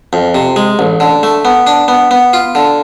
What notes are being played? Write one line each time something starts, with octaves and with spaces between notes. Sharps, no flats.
F2
C3
G#3
A1
D3
A3
B3
D4
B3
B3
F4
D3